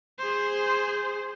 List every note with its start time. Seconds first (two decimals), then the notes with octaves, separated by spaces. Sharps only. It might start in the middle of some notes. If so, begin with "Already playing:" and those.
0.19 G#4 C5